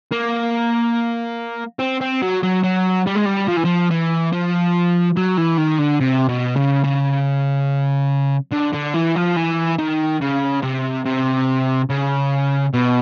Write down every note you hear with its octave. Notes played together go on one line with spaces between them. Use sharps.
A#3
C4
C4
F#3
F#3
F#3
G3
G#3
G3
F3
E3
F3
E3
F3
F#3
E3
D#3
D3
C3
B2
C#3
C#3
D3
D3
E3
F3
E3
D#3
C#3
C3
C3
C#3
B2